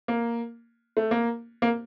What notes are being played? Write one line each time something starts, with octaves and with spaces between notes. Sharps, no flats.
A#3
A3
A#3
A#3